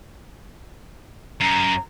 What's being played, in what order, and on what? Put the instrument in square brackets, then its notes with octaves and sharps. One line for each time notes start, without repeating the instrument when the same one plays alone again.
[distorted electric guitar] F#2 [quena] A#5